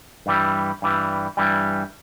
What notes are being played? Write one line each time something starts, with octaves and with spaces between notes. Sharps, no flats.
G2 E3 G3
G2 E3 G3
G2 E3 G3